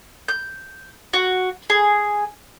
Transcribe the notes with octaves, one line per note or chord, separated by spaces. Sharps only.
G6
F#4
G#4